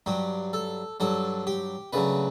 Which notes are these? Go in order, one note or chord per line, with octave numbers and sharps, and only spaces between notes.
G2 F#3 G4
A4
G2 F#3 A4
G4
D2 C#3 F#3 B4